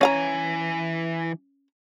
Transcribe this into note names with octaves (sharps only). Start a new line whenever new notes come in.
E3 C#4 F5 G#5 A#5